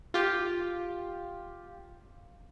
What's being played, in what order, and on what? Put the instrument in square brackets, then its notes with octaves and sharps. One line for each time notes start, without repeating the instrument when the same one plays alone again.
[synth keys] F4 G4